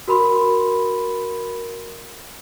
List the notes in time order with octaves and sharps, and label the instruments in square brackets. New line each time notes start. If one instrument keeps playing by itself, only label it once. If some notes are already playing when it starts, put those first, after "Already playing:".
[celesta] F#4 A#4 B5 C6